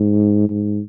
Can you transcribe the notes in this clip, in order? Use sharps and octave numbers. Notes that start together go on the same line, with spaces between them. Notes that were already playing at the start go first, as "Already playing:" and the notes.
Already playing: G#2
G#2